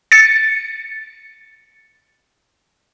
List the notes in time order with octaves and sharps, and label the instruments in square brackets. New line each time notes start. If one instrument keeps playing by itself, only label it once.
[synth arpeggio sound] A6 C#7